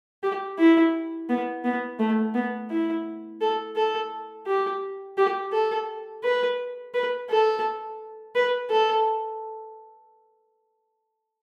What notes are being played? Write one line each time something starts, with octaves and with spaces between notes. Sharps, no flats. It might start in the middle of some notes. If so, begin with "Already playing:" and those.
G4
E4
B3
B3
A3
B3
E4
A4
A4
G4
G4
A4
B4
B4
A4
B4
A4